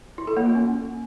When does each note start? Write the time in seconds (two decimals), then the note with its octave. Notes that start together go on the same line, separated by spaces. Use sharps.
0.18 E4
0.27 A4
0.37 A#3
0.46 F4
0.55 C#4